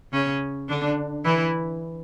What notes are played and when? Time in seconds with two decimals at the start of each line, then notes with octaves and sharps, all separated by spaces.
0.13 C#3 C#4
0.69 D3 D4
1.24 E3 E4